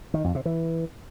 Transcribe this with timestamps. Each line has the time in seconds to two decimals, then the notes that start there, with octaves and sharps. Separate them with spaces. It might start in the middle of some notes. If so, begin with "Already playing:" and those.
0.14 D#3
0.24 F2
0.35 C3
0.45 E3